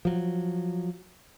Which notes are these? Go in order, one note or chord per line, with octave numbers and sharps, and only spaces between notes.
F3 F#3